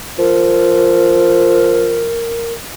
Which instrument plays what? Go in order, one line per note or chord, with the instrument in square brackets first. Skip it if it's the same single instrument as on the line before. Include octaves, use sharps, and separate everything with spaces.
[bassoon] F3 [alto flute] A#4